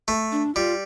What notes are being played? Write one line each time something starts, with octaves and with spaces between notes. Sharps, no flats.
A3
D4
G3 F4